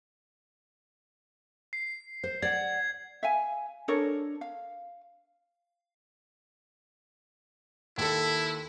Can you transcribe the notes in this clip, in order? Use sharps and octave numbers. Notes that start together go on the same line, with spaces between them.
C7
C5
D5 F#5 G#6
E5 F5 G#5
D4 A4 A#4 C#5
F5
D#2 E4 A4